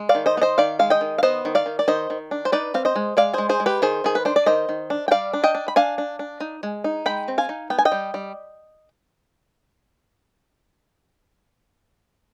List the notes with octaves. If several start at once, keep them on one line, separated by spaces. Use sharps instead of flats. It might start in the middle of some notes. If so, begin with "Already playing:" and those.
Already playing: G#3
D5 F5
D#3
C5 D#5
B3
C5 D#5
D#3 D5 F5
G#3 F5
D#5 G5
D#3
F5
B3 C5 D#5
D#3
D5 F5
D#3
D5
D#3 C5 D#5
D#3
D4
C5
D#4 B4 D5
C4 F5
C5 D#5
G#3
G#3 D5 F5
G#3 G#4 C5
G#4 C5
G#3
G4 B4
D#3 G#4 C5
D#3 G#4
B4
D4 C5
D5
D#3 C5 D#5
D#3
D4
G5
G3 D5 F5
D4
D#5 G5
D4
B5
D4 F5 G#5
D4
D4
D#4
G#3
D#4
G#3 G5 B5
C4
F5 G#5
D#4
B3 G5
G#5
D#5 G5
G3
G3